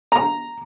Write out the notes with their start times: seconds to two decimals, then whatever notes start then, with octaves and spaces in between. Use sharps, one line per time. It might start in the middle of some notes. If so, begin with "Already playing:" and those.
0.12 A#5